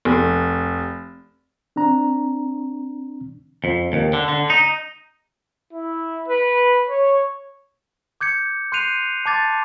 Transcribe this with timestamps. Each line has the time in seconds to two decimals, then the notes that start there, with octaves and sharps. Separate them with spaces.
0.05 F1
1.76 C4 D4 A#5
3.64 F2
3.93 D#2
4.13 D3
4.28 D3
4.50 D#4
5.73 E4
6.28 B4
6.89 C#5
8.21 D6 G6 G#6 C#7
8.72 C6 F#6 G6 C7 D#7 F7
9.26 A5 C6 D6 G#6 A6